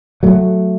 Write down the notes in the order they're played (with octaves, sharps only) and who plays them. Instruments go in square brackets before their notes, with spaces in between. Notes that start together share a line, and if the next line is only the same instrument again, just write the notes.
[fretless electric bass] F#3 A3